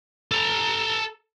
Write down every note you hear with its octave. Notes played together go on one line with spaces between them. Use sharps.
A4 A#5